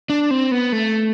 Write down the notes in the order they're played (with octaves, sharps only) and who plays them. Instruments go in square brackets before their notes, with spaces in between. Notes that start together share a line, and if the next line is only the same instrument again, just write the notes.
[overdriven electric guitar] D4
C4
B3
A3